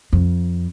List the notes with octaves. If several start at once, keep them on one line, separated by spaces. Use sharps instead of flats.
F2